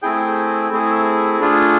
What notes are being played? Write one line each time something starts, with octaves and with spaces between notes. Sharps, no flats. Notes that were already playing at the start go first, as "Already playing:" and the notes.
A3 C4 E4 G#4 G5
A3 C4 E4 G#4
A3 D4 F4 G#4